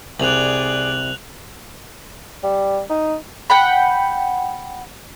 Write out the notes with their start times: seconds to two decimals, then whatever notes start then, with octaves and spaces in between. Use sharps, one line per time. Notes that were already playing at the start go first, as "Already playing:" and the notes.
0.20 C2 G#4 D5 F#6 F7 F#7
2.43 G3
2.90 D#4
3.50 F#5 G5 B5